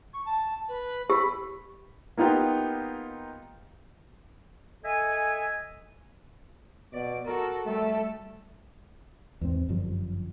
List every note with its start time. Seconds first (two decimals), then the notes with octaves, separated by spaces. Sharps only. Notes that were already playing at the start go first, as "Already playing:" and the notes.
0.13 C#6
0.25 A5
0.68 B4
1.10 G4 B5
2.18 A#3 B3 D#4 F4 G4
4.84 A4 D#5 E5 G#5
6.93 B2 D5
7.26 F#4 A4 A#4
7.66 G3 A3 A4
9.41 E2 G#2 C4
9.69 G1 F#2 F3 G3